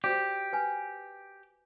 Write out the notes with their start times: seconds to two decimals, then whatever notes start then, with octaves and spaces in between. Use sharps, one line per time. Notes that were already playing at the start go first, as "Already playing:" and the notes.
0.04 F#4 G4 C5 D5
0.53 B4 G#5